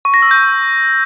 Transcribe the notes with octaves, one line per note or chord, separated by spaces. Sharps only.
C#6
A#6
E6
G6